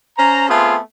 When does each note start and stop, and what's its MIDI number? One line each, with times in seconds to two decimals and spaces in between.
0.18 0.49 61
0.18 0.49 72
0.18 0.49 82
0.49 0.78 57
0.49 0.78 59
0.49 0.78 60
0.49 0.78 65
0.49 0.78 68